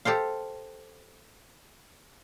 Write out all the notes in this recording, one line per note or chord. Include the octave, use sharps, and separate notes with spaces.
G4 A4 C5 F5